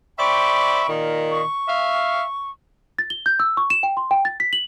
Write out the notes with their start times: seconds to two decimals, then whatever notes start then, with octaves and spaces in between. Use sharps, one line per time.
0.19 C5 D5 E5 G5 B5 C#6
0.89 A#2 D#3
1.29 C#6
1.68 E5 F5
2.99 A6
3.10 G7
3.26 G6
3.40 E6
3.57 C#6
3.70 E7
3.83 G5
3.97 C6
4.11 G5
4.25 A6
4.40 B6
4.53 F#7